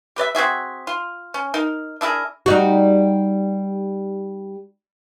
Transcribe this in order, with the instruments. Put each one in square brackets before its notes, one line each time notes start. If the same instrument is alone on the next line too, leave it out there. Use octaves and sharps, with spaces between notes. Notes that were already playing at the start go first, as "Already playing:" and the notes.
[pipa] G4 B4 D5 E5
C4 F#4 G#4 E5
F4
C#4
D#4 A#4
D4 E4 G#4 A#4
[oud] G3 D#4 F#4